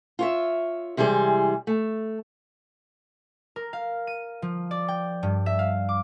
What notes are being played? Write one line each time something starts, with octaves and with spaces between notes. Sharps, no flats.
F4 C#5 E5
C3 E3 G3 G#3 G#4
A3
A#4
F5
D#7
F3
D5
G5
G2
E5
F5
D6